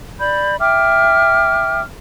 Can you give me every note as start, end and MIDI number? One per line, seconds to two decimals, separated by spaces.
0.20 0.56 74
0.20 0.56 83
0.20 0.56 91
0.59 1.81 76
0.59 1.81 79
0.59 1.81 86
0.59 1.81 89